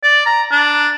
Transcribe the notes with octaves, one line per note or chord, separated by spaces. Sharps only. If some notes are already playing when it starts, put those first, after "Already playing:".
D5
A#5
D4